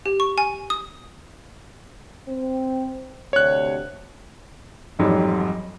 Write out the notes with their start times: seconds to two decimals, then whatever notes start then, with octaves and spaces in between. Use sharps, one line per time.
0.06 G4
0.20 C#6
0.38 G#5
0.70 D#6
2.27 C4
3.33 D2 C3 C#5 F#6
4.99 A1 F2 G#2 F#3 G3